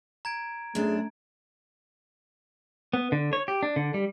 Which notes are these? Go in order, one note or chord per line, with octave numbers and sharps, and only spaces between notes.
A#5 G#6 D7
F#2 A3 D4 G#4
B3
D3
C#5
G4
D4
D3
G3